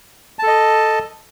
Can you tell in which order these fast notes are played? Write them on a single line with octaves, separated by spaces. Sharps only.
A5 A4 D#5